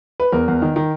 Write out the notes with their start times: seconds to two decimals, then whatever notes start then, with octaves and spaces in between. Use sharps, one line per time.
0.20 B4
0.32 E2 A#4
0.48 E2
0.62 D#3
0.76 D#3